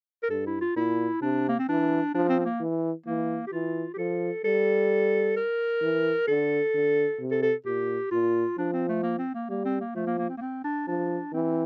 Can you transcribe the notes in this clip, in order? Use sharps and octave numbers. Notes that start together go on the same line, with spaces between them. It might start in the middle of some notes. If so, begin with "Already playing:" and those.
A#4
G2 A4
E4
F4
A#2 E4
C3 D4
A#3
C4
E3 D4
F3 D4
C4
C4
A#3
E3
E3 A#3
G4
E3 F4
G4
F3 A4
G3 A4
A#4
E3
D3 A4
D3
C3
A4
A4
A#2 G4
A#2 F4
F3 D4
C4
A3
A#3
C4
A#3
G3 A#3
C4
A#3
F3 A3
A#3
A#3
C4
A#3
C4
D4
F3 D4
E3 C4